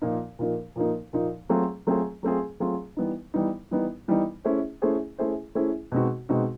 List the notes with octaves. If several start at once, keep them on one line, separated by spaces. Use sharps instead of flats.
A#2 F3 A#3 D#4
A#2 F3 A#3 D#4
A#2 F3 A#3 D#4
A#2 F3 A#3 D#4
F#3 A3 C4 F4 G#4
F#3 A3 C4 F4 G#4
F#3 A3 C4 F4 G#4
F#3 A3 C4 F4 G#4
E3 G3 B3 D#4
E3 G3 B3 D#4
E3 G3 B3 D#4
E3 G3 B3 D#4
A3 C#4 E4 G#4 C5
A3 C#4 E4 G#4 C5
A3 C#4 E4 G#4 C5
A3 C#4 E4 G#4 C5
B2 G#3 C4 D#4 F#4
B2 G#3 C4 D#4 F#4